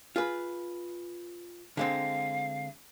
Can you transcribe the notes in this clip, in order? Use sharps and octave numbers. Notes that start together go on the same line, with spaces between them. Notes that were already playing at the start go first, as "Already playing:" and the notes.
F4 G#4 B4
D3 G#3 C4 F5